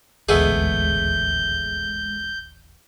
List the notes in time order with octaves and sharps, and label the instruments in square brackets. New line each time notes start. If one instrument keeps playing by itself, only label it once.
[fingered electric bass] D#1 A1 D2 [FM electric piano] G#3 [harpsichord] A3 B3 G#4 [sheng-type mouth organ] G6